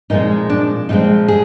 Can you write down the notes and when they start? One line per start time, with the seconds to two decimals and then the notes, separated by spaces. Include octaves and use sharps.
0.10 A#2 F3 G#3 C4 D#4
0.50 D4
0.89 A#2 F3 G#3 C4 D#4
1.28 G#4